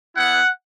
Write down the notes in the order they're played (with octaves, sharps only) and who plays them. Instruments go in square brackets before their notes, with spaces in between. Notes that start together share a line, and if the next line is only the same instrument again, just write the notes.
[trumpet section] B3 E4 F#5